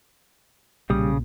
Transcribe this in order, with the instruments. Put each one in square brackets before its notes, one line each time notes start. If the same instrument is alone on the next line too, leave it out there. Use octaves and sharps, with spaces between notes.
[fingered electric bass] B1 A#2 [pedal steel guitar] C#3 D#6 [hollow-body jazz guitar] G3